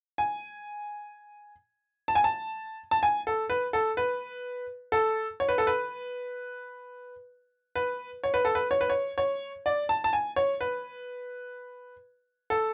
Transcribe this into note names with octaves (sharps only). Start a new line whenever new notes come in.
G#5
A5
G#5
A5
A5
G#5
A4
B4
A4
B4
A4
C#5
B4
A4
B4
B4
C#5
B4
A4
B4
C#5
B4
C#5
C#5
D5
A5
A5
G#5
C#5
B4
A4